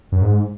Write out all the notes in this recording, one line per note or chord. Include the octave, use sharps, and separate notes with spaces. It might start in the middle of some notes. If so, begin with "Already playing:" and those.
F#2
G#2